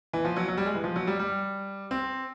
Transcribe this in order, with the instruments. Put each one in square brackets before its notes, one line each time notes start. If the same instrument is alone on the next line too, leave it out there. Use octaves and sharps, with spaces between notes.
[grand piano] E3
F3
F#3
F#3
G3
G#3
E3
F3
F#3
G3
G3
C4